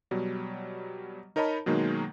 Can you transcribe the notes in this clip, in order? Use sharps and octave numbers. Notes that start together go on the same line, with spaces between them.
B2 F#3 G3
D#4 A#4 C#5 D#5 A5 B5
B2 D#3 F#3 G#3 A#3 D#4